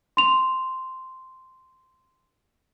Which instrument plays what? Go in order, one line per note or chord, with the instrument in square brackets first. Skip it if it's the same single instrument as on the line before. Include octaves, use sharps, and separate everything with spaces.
[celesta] C6 F7